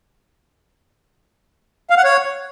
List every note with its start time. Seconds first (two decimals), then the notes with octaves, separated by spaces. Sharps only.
1.90 F5
1.97 F#5
2.04 C#5